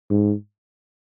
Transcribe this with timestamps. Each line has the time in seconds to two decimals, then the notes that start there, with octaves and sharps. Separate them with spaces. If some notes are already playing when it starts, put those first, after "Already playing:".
0.10 G#2